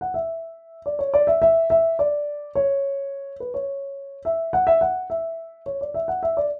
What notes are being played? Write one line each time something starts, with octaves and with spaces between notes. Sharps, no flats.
F#5
E5
D5
C#5
D5
E5
E5
E5
D5
C#5
B4
C#5
E5
F#5
E5
F#5
E5
C#5
D5
E5
F#5
E5
D5